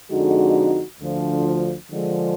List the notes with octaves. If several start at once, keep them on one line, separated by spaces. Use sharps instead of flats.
F2 D3 G#3 D#4 F#4
D2 D3 F3
D3 F3 G#3